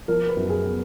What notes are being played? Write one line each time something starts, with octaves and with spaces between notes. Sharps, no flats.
F3 A#4
B4
F#2
G#4
B3